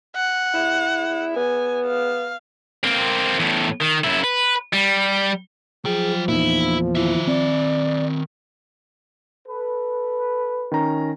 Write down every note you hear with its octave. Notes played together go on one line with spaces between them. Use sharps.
F#5
E4
B3 G#5
F5
A#3 C4
E2 A2
D#3
F#2 E4
B4
G3
F3 F#3 G#4 G5
E2 A#2 D#4 E4
D#3 E4 E5
C4 D5
A4 B4
D#3 C#4 A#5